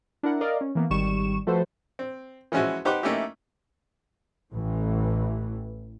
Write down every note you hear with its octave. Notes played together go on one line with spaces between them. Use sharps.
D4 E4 A#4 F#5
A#4 D5 D#5 F5
C#4
E3 A#3 B3
G#1 D#3 G3 C#6 E7
F3 A3 F#4 A4 B4 C5
C4
E3 F3 G#3 C#4 E4 F#4
D#4 G4 B4 C5 F#5 D6
A3 A#3 C#4 D#4 E4 G4
A1 A2 E3